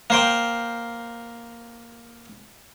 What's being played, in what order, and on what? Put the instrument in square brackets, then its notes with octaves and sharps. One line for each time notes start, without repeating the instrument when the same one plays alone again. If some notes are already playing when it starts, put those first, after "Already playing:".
[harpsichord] A#3 C5 G5